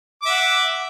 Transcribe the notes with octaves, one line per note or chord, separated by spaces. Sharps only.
E5 F#5 D6